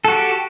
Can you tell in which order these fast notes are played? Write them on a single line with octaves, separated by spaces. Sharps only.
A4 F#4 G4